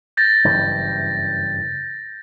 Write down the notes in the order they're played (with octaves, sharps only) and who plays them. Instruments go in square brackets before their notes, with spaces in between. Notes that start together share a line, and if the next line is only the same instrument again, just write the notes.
[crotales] G6 A6 A#6
[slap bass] F#1 G2 E3